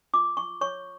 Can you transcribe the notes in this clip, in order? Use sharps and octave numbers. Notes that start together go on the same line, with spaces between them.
F4 D6
C#6
C#5 C#6